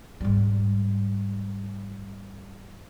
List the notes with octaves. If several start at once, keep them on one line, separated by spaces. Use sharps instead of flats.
G#2 G3